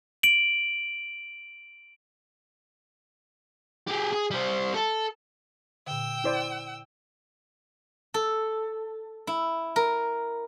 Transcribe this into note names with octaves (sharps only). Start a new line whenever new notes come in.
D7 F#7
G4 G#4
G#4
G3 C5
A4
A#2 D3 G5 E6
E4 C5 D5
A4
E4
A#4